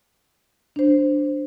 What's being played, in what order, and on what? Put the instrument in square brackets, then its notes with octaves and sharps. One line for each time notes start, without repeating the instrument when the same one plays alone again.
[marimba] D4 C5